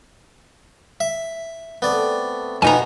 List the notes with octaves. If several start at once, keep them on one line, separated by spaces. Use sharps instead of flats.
E5
A3 B3 C4 D5
F2 B2 B3 D#4 F4 G#5 A#5